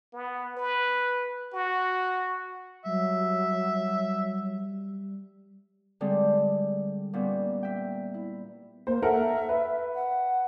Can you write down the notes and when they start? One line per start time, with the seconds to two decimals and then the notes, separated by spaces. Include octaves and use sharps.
0.13 B3
0.57 B4
1.53 F#4
2.86 F#3 G3 E5
6.01 D3 G3 G#3 C4
7.13 A#2 G3 B3 C#4
7.63 E5 G5
8.14 E4
8.87 A#3 C5
9.02 A4 A#4 E5 F#5
9.49 B4
9.94 F#5